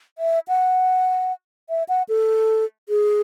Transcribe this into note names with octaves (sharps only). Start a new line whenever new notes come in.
E5
F#5
E5
F#5
A4
G#4